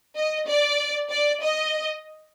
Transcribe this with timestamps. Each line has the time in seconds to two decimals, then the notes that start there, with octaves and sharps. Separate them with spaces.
0.16 D#5
0.48 D5
1.10 D5
1.41 D#5